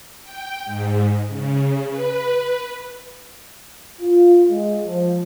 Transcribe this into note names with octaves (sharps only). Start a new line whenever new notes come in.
G5
G#2
C#3
B4
F4
G#3
F3